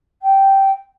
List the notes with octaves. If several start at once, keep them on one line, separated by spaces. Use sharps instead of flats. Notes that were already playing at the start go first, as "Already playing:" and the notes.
G5